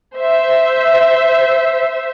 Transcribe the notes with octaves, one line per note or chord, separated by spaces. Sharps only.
C5 E5